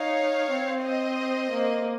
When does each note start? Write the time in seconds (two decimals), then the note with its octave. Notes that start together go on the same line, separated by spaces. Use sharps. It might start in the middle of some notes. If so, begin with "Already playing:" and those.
Already playing: D#4 C#5 F5
0.50 C4
0.83 C5 D#5
1.51 A#3